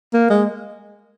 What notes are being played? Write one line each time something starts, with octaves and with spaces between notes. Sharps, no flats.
A#3
G#3